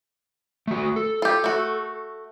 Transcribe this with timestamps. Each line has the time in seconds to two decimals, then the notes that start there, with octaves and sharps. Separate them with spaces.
0.67 A3 F#4
0.96 A4
1.22 F4 G4
1.44 A3 F#4